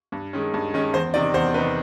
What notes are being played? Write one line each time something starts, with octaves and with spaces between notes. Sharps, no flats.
G2
D#3 G#3 C#4
G2
D#3 G#3 C#4
E2 C5
C3 D#3 D5
E2 C5
C3 D#3 B4